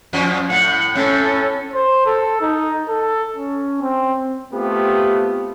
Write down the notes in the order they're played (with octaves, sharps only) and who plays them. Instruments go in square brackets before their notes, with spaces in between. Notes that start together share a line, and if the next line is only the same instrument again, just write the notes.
[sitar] F2 F3
[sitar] A2 [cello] F#5
[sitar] A2 [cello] C#4 A4
[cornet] C5
A4
D#4
A4
C#4
C4
[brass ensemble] A3 B3 C4 F4 G4